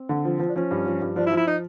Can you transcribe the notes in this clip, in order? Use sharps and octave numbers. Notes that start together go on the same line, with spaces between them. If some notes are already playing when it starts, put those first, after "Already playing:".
Already playing: C4
D3
F3
F3
D4
F3 C#4
G2
F3
G2
F3 D4
E4
F3
E4
D#4